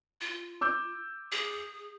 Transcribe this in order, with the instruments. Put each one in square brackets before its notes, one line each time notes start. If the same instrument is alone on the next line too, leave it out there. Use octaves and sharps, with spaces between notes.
[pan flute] F4
[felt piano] D6 E6 G6
[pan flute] G#4